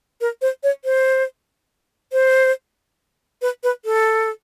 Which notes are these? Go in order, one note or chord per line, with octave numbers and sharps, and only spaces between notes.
A#4
C5
C#5
C5
C5
B4
B4
A4